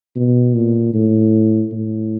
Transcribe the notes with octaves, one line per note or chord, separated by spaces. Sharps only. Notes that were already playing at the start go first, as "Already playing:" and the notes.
B2
A#2
A2
A2